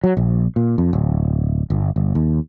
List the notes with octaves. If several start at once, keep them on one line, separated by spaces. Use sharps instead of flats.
F#3
A#1
A#2
F2
D1
G1
G1
D#2